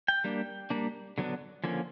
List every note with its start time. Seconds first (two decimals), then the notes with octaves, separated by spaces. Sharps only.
0.08 G5
0.24 G3 A#3 D4
0.70 G3 A#3 D4
1.18 D3 F#3 B3 D4
1.64 D3 F3 A#3 C#4